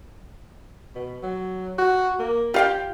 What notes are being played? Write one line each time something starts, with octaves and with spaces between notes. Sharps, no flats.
B2
F#3
F#4
A#3
F4 G4 F5 G5